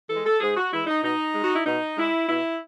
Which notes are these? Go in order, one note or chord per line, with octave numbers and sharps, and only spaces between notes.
E3 G#3 A4
A4
G#2 G#4
F#4
E3 G#3 E4
D#4
B2 D#4
G#3
F#4
E4
B2 D#4
G#3 E4
B2 E4